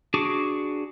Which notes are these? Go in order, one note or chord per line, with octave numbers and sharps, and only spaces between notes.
D4 F#4 G#4 C#6 D6